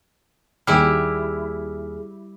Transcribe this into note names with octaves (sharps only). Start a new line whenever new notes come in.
D#2 G3 E4 G#4 F6